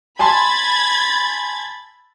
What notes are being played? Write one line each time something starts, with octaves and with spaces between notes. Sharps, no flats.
G#5 A5 B5 C6 G#6 A6